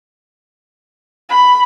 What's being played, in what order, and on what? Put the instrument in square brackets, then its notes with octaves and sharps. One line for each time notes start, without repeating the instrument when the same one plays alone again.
[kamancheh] B5